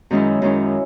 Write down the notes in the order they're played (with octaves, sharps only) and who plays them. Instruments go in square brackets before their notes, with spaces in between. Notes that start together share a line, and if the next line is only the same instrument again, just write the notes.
[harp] F#2 D#3 G#3 C#4 E4
F#2 D#3 G#3 C#4 E4